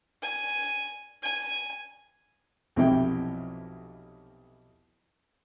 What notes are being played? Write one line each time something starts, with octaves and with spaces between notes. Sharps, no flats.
G#5
G#5
B1 F2 C3 E3 E4 G5